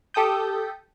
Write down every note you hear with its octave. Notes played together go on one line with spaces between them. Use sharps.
G4 A4 G5 D#6 G6